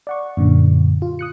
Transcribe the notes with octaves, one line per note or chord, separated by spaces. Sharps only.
D5 F#5 C#6
F#2 A#2 D3
F4
D#6 F#6 C#7